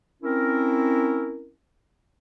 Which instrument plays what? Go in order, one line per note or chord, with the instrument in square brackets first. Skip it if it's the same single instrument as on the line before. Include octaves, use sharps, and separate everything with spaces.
[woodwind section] C4 C#4 E4 A#4